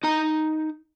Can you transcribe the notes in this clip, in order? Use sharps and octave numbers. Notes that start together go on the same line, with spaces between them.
D#4 A#5